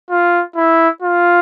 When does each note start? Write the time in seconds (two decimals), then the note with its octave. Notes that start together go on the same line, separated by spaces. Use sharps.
0.10 F4
0.56 E4
1.02 F4